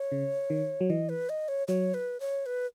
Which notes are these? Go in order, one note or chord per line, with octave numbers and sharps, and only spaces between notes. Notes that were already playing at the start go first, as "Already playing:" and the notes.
Already playing: C#5
C#3
D#3
F#3
E3 D#5
B4
D#5
C#5
F#3 C#5
B4
C#5
B4